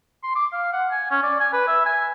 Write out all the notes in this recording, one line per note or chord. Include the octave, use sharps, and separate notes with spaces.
C6
D6
F5
F#5
G#5
C#4
D5
G#5
B4
E5
G#5